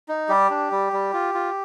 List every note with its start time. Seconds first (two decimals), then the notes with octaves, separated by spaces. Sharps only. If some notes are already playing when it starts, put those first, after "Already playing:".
0.09 D#4
0.29 G3 G4
0.50 D4
0.71 G3
0.92 G3
1.13 F4
1.34 F4